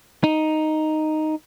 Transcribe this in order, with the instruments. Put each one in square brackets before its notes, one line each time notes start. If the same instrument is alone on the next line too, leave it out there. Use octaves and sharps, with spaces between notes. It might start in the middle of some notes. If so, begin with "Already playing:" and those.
[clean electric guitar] D#4